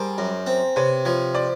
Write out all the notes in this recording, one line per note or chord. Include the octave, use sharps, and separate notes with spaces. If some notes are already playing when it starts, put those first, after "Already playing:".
Already playing: G3 G#4 A#4 C5
F#2
C4
C3 B4 C#5
F3 B4 C#5
C5 D5